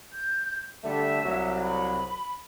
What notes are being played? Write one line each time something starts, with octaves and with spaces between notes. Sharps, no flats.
G6
D3 G3 A3 E5
C2 F#3
B5